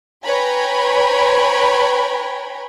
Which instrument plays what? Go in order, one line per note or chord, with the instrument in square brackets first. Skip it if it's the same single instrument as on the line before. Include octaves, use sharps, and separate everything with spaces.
[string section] B4 C#5 G5 G#5 A#5 B5